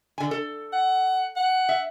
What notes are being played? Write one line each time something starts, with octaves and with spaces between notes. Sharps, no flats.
D3 G#5
A4
F#5
F#5
E5